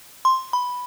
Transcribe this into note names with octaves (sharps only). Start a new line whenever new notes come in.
C6
B5